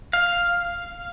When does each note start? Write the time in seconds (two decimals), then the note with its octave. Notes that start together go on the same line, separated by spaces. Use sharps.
0.13 F5